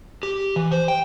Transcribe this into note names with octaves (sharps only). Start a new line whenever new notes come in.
G4
E3
C5
G5